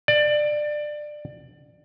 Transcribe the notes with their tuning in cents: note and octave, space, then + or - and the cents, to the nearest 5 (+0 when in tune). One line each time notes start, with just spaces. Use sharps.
D5 +20